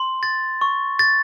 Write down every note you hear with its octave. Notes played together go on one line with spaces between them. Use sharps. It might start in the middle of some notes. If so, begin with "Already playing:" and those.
Already playing: C6
A6
C#6
A6